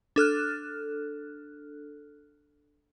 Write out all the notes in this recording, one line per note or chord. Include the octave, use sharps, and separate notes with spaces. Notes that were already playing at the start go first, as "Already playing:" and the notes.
D4 A4 F6 F#6